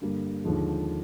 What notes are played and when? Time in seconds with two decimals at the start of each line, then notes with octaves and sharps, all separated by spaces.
0.01 G2 D3 G3 A#3
0.44 D#2 D3 F3 G#3